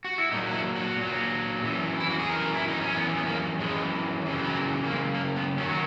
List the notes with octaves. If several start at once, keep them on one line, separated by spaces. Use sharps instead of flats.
F#4
E4
A#2 F#3 D#4
F#4
E4
F#4
A#2 F#3
F#2 E3
E4
F#4
G#4
F#2 E3 A#4
E4
D#4
C#4
F#2 E3 B3
B3
A#3
F#2 E3 G#3
F#2 C#3 E3 F#3
F#3
A#3
F#2 C#3 G#3
A#3
B3
F#2 D#3 F#3 C#4
F#4